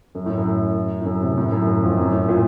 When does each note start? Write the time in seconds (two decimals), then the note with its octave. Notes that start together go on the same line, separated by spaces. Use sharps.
0.15 F#2
0.26 A2
0.38 F#2
1.01 A2
1.06 F#2
1.22 C3
1.37 A2
1.52 F#2
1.67 F#2
1.83 F2
1.97 F#2
2.12 A2
2.29 A#2